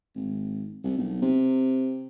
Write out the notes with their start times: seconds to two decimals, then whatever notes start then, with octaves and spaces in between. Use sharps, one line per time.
0.15 G#1
0.84 C2
0.98 B1
1.22 C3